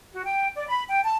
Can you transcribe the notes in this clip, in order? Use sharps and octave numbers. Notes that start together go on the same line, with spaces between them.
F#4
G5
D5
B5
G5
A5